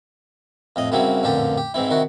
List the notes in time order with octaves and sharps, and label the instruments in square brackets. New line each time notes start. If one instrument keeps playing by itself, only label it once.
[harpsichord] F2 A2 D#5
F#2 C#3 F#3 G3 C4 E4
A1 F2 A#2 D3 G4 A5
G4
G#2 E3 C4 E4
C3 D#3 E4 F#4